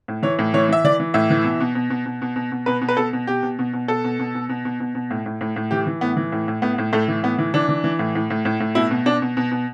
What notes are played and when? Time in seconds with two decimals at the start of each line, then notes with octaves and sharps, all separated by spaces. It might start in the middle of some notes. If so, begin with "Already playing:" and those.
0.08 A2
0.23 E3 C#5
0.39 A2
0.54 E3 C#5
0.69 E3 E5
0.84 E3 D5
1.00 E3
1.14 A2 E5
1.30 E3
1.44 B2
1.60 B2
1.75 B2
1.90 B2
2.06 B2
2.22 B2
2.36 B2
2.52 B2
2.66 B2 B4
2.81 B2
2.89 B4
2.97 B2 A4
3.13 B2
3.27 B2 G4
3.43 B2
3.59 B2
3.73 B2
3.88 B2 A4
4.04 B2
4.19 B2
4.35 B2
4.49 B2
4.65 B2
4.80 B2
4.95 B2
5.11 A2
5.26 A2
5.41 A2
5.56 A2
5.71 E3 G4
5.87 E3
6.01 A2 B3
6.17 E3
6.32 A2
6.48 A2
6.62 A2 B3
6.78 A2
6.93 A2 A3
7.08 E3
7.23 A2 B3
7.39 E3
7.54 E3 D4
7.69 E3
7.84 E3
7.99 A2
8.15 A2
8.30 A2
8.45 A2
8.60 A2
8.75 B2 E4
8.91 B2
9.06 B2 D4
9.22 B2
9.37 B2
9.51 B2